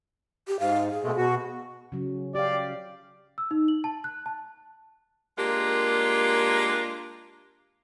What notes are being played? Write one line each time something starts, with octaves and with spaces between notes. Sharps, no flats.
G4
G#2 F5
G#4
B2 G#3 A3
B2 F#4
C#3 F#3
G4 D5 F5
E6
D#4
F#7
A5
F#6
A5
G#3 A#3 D4 F4 G4 A#4